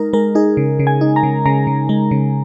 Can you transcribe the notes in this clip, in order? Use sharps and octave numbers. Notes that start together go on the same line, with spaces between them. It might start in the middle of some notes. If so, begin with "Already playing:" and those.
Already playing: G#3 D#4 A#4
G#3 A#4
D#4 G#4
C#3
C#3
G#5
D#4
A#5
C#3
C#3 A#5
C#3
G#3
C#3